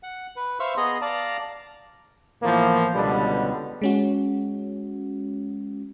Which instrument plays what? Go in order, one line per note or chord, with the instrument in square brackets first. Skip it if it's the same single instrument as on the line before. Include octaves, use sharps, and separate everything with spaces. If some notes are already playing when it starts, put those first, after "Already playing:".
[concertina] F#5
B4
C5 E5 F5 C#6 E6
B3 G#4 D#5 A#5
D5 F5 A5 A#5
[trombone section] A2 E3 F3 A#3 B3
C#2 B2 D3 G3 B3
[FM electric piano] G#3 C#4 F#4